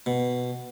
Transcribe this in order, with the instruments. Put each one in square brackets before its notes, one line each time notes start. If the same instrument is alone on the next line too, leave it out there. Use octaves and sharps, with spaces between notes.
[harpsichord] B2